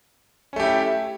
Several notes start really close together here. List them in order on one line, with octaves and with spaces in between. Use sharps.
C#4 A3 G4 E4